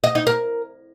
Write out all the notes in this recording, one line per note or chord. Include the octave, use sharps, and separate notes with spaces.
D#5
D#4
A#4